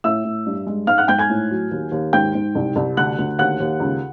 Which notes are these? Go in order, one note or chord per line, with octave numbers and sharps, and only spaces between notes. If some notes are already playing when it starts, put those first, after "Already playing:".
A2 E5 E6
A2
G2
G#3
G#2 F5 F6
F#5 F#6
G#2 G5 G6
G#5 G#6
A2
F#3
D#2
D#2
G#2 G5 G6
G#2
C2
C2
D2 F#5 F#6
D2
D#2 F#5 F#6
D#2
C#2